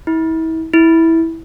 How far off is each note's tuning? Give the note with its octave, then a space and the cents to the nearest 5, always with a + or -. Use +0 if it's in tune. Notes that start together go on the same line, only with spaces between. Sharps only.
E4 -35
E4 -10